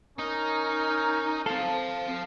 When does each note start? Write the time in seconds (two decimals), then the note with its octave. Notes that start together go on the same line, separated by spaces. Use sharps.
0.19 C#4 D#4 A#4
1.46 C4 A4 F5 A5